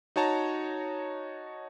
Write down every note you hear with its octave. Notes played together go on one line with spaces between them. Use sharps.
D#4 F#4 C#5 A5 A#5